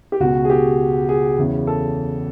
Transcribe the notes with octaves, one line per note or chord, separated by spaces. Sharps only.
G4
C#2 B2 F#4
G#4
G4
G#4
E2 C#3 E3
A4